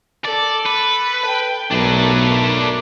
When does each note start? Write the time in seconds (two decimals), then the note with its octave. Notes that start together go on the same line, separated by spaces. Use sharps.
0.24 A4 D5
0.66 B4
1.25 G5
1.71 B1 A3 D4 A#4 B4